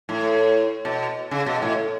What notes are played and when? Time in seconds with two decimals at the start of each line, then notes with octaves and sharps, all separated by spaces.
0.09 A2
0.85 B2
1.31 C#3
1.46 B2
1.62 A2